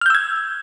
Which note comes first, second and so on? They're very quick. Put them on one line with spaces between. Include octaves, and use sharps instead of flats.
F6 G6 E6 G#6